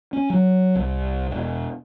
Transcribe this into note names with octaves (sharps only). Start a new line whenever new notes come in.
C#4
F#3
C2
E1